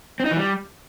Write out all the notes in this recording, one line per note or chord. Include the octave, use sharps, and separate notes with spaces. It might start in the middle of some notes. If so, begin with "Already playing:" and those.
C4
D#4
E3
G3